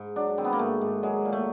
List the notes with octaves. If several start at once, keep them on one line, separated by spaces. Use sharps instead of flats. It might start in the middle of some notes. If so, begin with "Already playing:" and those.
Already playing: G#2
F#3 D4
D#3 C4
B3
A#3
G#2 A3
G#2
F#3 G#3
A#2
A3